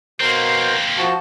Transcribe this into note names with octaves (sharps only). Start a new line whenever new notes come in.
B2 A#3 C4 A#4 C5
F3 F#4 A5